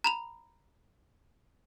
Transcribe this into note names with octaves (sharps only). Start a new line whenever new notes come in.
A#5 B5 F7